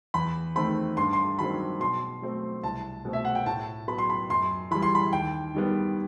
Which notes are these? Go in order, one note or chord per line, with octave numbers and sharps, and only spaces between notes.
E2 B5
D#3 A3 C4 B5
G2 C6
C6
D#3 F#3 C4 B5
B2 C6
F#3 A3 C4
C2 A5
B2 A3 C4
E5
F#5
G5
A2 A5
F#3 B3 B5
C6
B5
F#2 C6
E3 G3 B5
C6
B5
D#2 G5
D#3 G3 B3